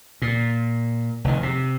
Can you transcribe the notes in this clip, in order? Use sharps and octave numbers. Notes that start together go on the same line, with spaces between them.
A#2
F1 D#3
C3